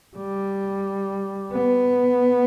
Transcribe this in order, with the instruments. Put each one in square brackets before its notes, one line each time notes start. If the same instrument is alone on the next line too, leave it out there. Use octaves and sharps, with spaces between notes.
[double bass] G3
B3